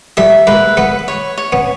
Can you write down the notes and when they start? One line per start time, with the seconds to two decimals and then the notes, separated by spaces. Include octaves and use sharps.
0.17 G3 A3 E5
0.47 G#3 A#3 B4
0.77 A3 B3 B4
1.08 C#5
1.38 C#5
1.52 B3 C#4